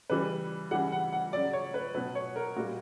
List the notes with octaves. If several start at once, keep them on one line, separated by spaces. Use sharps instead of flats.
C#3 E3 G3 B4
C#3 E3 G3 F#5
F#5
F#5
C#3 F#3 D5
C#5
B4
B2 F#3 B4
C#5
A#4
A#2 G3 F#4